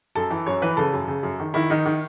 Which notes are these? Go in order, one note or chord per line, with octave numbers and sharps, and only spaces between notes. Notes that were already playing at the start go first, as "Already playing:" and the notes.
F#2 A4
E3
F#2 C#5
E3 B4
C#3 A4
F#2
C#3
F#2
D#3
D#3 E4
D#3 D#4
D#3